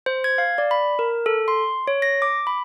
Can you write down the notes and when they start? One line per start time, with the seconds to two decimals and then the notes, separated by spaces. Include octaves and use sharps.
0.06 C5
0.24 G#6
0.38 F5
0.58 D5
0.71 B5
0.99 A#4
1.26 A4
1.48 C6
1.88 C#5
2.02 A#6
2.22 D6
2.47 B5